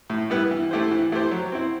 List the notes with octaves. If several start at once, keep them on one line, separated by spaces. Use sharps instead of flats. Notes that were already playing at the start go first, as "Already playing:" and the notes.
A2
G3 B3 E4 B4
E3
A3 E4 G4 C5
E3
A3 E4 G4 C5
F#3
C4 E4